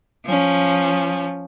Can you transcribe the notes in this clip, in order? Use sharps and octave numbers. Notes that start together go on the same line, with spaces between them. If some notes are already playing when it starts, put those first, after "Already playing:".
F3 C#4